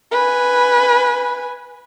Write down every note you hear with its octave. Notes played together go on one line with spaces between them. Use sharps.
B4 G#5